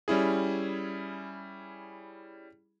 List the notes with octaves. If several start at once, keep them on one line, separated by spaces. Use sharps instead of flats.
G3 C#4 E4 G#4